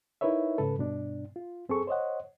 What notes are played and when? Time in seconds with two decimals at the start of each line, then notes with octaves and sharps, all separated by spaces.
0.21 D#4 E4 A#4 B4 C#5 E5
0.58 G#2 C#3 A4 B4
0.78 G2 B2 D4
1.36 F4
1.69 F#2 C4 G#4 A4 C#6
1.87 C5 C#5 D#5 F#5